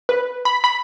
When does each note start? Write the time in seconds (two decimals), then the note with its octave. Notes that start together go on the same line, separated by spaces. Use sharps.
0.09 B4
0.45 B5
0.64 B5